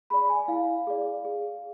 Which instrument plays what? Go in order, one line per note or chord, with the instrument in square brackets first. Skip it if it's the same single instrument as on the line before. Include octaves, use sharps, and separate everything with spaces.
[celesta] G#4 D5 B5
G#5
E4 F5
G#4 D5
G#4